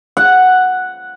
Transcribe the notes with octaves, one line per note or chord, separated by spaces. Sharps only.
F#5